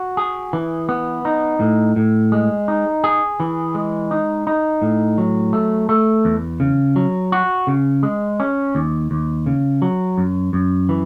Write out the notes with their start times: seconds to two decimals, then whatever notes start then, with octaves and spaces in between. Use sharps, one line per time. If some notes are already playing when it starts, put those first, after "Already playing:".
Already playing: F#4
0.17 G#4
0.53 E3
0.89 B3
1.25 D#4
1.60 A2
1.96 A2
2.32 G#3
2.68 D#4
3.04 G#4
3.40 E3
3.75 G#3
4.11 D#4
4.47 D#4
4.82 A2
5.18 F#3
5.53 A3
5.89 A3
6.25 E2
6.60 C#3
6.96 F#3
7.32 F#4
7.67 C#3
8.03 G#3
8.40 C#4
8.75 D#2
9.11 D#2
9.46 C#3
9.82 F#3
10.18 F#2
10.53 F#2
10.89 E3